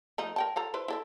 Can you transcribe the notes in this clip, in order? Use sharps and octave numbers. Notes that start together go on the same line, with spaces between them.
F3 A3 D#4
A#4 G5 A5
F4 A4 A#5
E4 B4 C5
E4 A4 E5